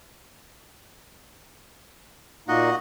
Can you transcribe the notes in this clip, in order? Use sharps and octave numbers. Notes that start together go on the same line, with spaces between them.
A#2 A#3 D#4 F#4 D#5 F#5